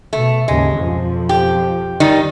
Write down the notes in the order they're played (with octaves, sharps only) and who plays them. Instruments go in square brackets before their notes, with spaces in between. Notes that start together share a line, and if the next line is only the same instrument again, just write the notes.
[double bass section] B2 [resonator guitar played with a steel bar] A3
[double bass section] D#2 G#2 C#3 [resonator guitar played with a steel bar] G#3
[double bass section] B1 F2 F3
[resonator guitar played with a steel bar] G4
D#3 G3 D#4